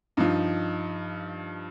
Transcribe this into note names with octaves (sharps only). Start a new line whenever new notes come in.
G2 F3 D#4